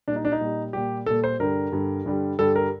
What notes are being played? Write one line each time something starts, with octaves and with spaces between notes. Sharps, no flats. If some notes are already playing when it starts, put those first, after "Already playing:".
A#2 G3 D4
D#4
D4
D#4
A#2 G3
A#2 G3 G4
A#2 G3 A4
C5
G2 D3 G3 A#4
G2 D3 G3
G2 D3 G3
G2 D3 G3 A4
A#4